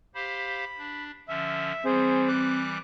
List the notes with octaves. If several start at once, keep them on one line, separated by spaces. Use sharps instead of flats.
G4 C5 F5 B5
D4
D3 F3 C#4 E5
E3 G3 C4 G#4 C5
D6 F#6